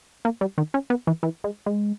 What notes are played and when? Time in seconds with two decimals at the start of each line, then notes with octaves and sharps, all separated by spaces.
0.25 A#3
0.41 G3
0.58 D#3
0.74 C#4
0.90 B3
1.07 E3
1.23 E3
1.44 G#3
1.66 G#3